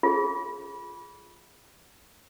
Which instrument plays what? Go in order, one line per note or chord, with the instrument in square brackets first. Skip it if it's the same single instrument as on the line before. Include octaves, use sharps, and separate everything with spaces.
[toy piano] F4 G#4